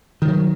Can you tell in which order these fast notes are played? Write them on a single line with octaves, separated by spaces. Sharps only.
D#3 F3 F#3